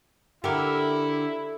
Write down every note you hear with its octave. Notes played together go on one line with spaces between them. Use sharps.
D3 E4 G4 A#4